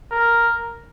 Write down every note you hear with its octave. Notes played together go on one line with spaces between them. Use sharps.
A#4